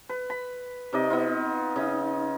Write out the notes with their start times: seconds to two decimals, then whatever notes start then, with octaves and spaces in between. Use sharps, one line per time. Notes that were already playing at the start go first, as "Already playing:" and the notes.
0.09 B4
0.30 B5
0.93 C3 D#4 D5 D#5
1.10 B3 D#4 F4
1.76 C#3 D#4